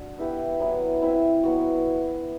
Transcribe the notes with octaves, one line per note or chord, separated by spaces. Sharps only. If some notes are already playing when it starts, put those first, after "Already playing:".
Already playing: D4 F#4
B3 E4 G4 B4
F#3 B3 E4 B4
C4 E4 B4 E5
F#3 B3 F#4